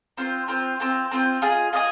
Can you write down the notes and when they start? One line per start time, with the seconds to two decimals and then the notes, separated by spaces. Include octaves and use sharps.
0.17 C4 F4 C5
0.48 C4 F4 C5
0.80 C4 F4 C5
1.11 C4 F4 C5
1.42 F4 G#4 D#5 G#5
1.73 F4 G#4 D#5 G#5